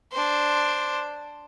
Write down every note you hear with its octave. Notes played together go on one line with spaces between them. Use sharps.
D4 C5